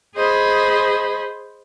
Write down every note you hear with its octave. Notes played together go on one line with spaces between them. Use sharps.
G#4 C5 D#5 B5